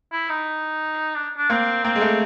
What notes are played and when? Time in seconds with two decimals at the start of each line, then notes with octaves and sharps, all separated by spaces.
0.12 E4
0.30 D#4
1.15 D4
1.38 D4
1.50 A#3 C4
1.84 A#3 C4
1.96 G#3
2.01 A3